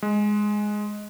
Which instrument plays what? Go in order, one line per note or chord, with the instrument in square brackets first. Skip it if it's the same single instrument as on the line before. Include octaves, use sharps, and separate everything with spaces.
[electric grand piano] G#3